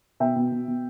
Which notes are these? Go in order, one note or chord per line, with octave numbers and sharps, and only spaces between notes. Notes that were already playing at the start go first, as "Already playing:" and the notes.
B2 E5 G5
B2
B2
B2